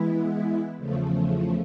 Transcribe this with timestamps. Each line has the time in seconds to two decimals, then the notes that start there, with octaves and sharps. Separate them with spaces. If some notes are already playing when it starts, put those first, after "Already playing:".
Already playing: E3 G#3 B3 E4
0.78 E2 C#3 F3 A3